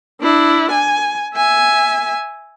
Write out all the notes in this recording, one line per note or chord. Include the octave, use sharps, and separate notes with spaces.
D4 E4
G#5
E5 G#5